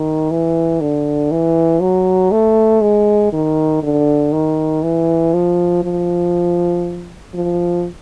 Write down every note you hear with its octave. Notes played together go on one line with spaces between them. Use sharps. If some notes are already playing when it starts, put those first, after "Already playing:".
Already playing: D#3
E3
D3
E3
F#3
A3
G#3
D#3
D3
D#3
E3
F3
F3
F3